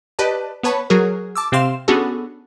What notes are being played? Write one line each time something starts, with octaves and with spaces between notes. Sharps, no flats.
G4 B4 D5 D#5 A5
B3 B4 C#5 A5 B5
F#3 F#4 G#4 A#4
A5 D6 E6
C3 C4 F5 C6 E7
B3 C#4 D4 F#4 G#4 A4